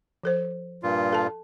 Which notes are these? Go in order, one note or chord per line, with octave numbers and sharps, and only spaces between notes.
F3 A4 C5
G2 A#2 F4
A4 A5